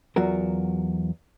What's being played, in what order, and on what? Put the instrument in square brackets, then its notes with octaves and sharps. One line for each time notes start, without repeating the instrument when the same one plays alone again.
[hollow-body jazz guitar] E2 F#3 F4 F#4 A#4